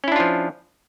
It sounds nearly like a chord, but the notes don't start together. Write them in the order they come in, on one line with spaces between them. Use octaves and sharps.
C#4 E4 D4 F4 F3